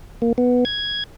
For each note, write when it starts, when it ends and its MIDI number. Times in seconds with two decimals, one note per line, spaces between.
0.22 0.33 58
0.38 0.64 59
0.65 1.04 92